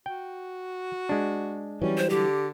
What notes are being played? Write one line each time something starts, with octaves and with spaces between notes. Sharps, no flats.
F#4 G5
G#3 D4
E3 F#3 G3 C#4
C5
D3 G4